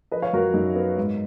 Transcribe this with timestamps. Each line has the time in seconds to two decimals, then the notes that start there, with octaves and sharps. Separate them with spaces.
0.12 F3 B4 D#5
0.22 C#5 F5
0.33 F#2 F#4 A#4
0.54 F#2 D#4
0.76 B3
0.97 G#2